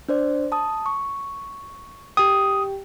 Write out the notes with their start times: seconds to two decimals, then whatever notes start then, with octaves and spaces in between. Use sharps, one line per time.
0.09 D4 C5 D5
0.52 A5 D#6
0.86 C#6
2.17 G4 G5 D#6